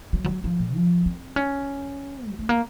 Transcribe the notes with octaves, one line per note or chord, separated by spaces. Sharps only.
F#3
F3
F#3
F3
A#2
F3
C4
C#4
F#3
A3
A#3